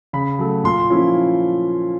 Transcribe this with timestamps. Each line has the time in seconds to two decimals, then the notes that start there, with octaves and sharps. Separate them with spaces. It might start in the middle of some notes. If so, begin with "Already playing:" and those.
0.13 C#3 B5
0.39 F#3 A3
0.64 A#2 C6
0.90 F3 A#3 C#4 E4